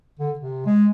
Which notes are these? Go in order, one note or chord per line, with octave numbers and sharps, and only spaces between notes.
D3
C3
G#3